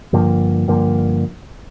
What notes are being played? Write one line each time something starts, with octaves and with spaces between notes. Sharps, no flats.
G2 D3 F3 A#3
G2 D3 F3 A#3